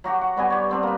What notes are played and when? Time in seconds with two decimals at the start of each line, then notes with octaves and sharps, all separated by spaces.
0.04 F#3 F#4 G4 F#5
0.21 F#5
0.37 G2 G3 B3 G#5
0.50 G4 C#5
0.69 B3 C4 D4 B4
0.83 A#3 B4